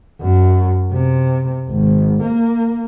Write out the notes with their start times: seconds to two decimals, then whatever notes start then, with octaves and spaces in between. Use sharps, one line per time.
0.22 F#2
0.92 C3
1.70 G#1
2.23 A#3